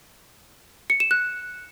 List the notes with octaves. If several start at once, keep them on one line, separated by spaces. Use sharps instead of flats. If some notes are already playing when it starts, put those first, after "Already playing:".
C#7
E7
F#6